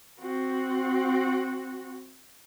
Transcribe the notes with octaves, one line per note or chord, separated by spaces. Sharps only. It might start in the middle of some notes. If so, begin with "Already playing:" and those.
C4 F#4